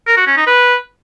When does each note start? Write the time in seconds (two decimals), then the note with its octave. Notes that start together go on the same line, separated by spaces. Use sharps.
0.07 A#4
0.17 F#4
0.27 C#4
0.37 D#4
0.47 B4